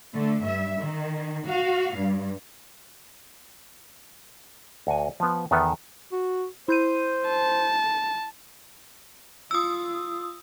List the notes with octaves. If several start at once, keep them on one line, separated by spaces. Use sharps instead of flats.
D3 A3
G2 E5
D#3
F#4 F5
G2
D2 F#4 G#5
F3 B3
E2 D#3 B3 A4 B4 E5
F#4
E4 C5 G6 D#7
A5
F4 D#6 E6